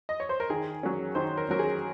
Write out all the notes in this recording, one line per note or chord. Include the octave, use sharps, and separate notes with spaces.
D#5
C#5
C5
A#4
D#3 G#4
F#3 C#4
D#3 C5
A#4
F#3 C#4 A#4
G#4